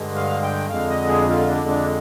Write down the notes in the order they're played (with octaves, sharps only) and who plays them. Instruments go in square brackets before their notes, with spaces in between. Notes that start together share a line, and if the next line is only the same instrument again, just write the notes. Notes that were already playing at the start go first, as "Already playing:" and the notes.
Already playing: [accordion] G2 D3 G#3
F5
G5
F2 D3 G#3 F5
D#5
G#4
F4
D4
D4